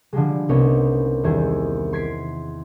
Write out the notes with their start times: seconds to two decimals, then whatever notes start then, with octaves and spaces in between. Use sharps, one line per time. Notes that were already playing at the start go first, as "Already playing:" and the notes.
0.13 D3 F3 G3 G#3
0.49 C2 B3 C#4 D#4 C#5
1.23 E2 D#3 G3 E4 G#4
1.93 C6 G#6 B6 D7